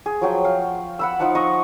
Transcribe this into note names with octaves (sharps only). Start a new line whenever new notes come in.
G#4
F3 F#3 G5
F5
F#5 B5 E6
F3 D#4 F#5 A5
D#5 A#5 C#6